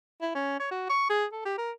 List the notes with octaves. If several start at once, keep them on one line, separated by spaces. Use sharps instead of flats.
E4
C#4
C#5
F#4
C#6
G#4
A4
G4
A#4